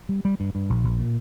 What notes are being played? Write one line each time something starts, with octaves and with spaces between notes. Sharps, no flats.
G3
G3
G2
G2
A#1
A#1
A#2